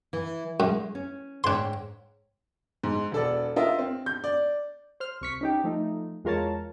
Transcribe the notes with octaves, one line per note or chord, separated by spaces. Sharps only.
E3
F#2 G#3
C#4
G#2 D4 C#5 G5 C6
G#2
E1 A4 D5
F4 A#4 D#5 E5
C4
G6
D5
C5 F6
C2 C#6 B6
C#4 D#4 G4
F3 A3 D#4
E2 G#3 F4 A#4 C#5 A5